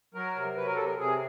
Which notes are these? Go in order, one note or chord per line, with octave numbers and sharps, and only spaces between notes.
F#3 A#4
C3
F#3 B4
A#4
C3 A4
A#4
C3 G#4